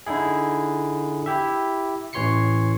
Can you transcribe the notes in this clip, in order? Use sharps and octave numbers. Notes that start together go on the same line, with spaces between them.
D3 D#4 E4 G#4
E4 G4 E5
A1 E3 C#5 C6 C7 C#7